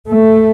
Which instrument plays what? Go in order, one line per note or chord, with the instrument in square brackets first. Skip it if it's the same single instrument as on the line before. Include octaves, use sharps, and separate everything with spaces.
[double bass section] A3